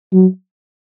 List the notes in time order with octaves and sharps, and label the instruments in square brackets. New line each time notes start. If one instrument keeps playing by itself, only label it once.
[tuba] F#3